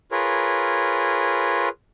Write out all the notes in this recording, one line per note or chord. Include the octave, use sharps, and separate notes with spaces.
F4 G#4 A#4 B4 C#5